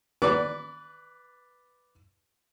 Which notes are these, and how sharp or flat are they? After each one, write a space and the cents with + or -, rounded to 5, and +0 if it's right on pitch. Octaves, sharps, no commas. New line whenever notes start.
B4 +0 D5 +0 D6 -35